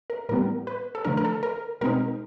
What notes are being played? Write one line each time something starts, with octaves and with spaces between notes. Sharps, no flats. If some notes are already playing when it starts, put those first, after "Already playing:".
A#4
A2 E3 G3 B3 A#4
B4
A4
D3 F3 A3 D4 A#4
A#4
A4
A#4
B2 G#3 C4 D#4 A#4